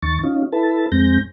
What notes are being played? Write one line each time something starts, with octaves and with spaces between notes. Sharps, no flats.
D#2 D#3 C#6 A6
C#4 D#4 F4
E4 A4 B4 A5
F2 G#3 C4 G6 A#6